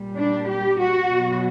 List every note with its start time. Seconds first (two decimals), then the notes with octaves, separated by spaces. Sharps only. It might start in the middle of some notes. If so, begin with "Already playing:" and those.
Already playing: A#2 G3
0.16 D4
0.48 G4
0.79 F#4
1.10 B2 F#3